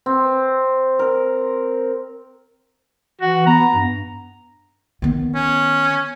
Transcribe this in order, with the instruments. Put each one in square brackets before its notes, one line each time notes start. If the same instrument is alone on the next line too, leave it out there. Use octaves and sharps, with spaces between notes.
[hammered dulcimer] C4
A#4
[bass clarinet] E3 [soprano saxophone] F#4
[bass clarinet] B3 [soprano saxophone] A#5
[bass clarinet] G2
[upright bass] D#3 B3
[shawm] C#4